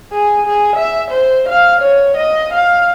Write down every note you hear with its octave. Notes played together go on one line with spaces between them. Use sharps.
G#4
G#4
E5
C5
F5
C#5
D#5
F5